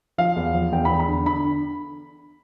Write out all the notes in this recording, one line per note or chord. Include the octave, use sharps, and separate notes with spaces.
F3 F5
E2
F3
E2 G5
B5
E2
B5
D3
D3 B5